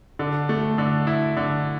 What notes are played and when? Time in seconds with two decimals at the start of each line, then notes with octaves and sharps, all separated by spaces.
0.19 D3
0.49 A3
0.78 D3
1.07 E4
1.37 D3